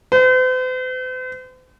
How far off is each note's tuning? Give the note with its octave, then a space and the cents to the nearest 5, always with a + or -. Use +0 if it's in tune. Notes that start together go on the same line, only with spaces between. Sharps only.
C5 -45